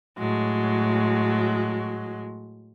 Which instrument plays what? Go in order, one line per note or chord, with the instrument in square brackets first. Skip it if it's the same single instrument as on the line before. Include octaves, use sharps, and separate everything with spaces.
[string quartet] A2 F#3 G#3